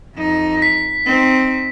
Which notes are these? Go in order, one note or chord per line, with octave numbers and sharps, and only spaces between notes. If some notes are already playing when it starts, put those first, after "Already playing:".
F2 D#4
B6
C4 D#4